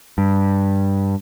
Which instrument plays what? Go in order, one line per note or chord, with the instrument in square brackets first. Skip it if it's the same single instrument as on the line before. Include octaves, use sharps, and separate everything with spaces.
[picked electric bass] G2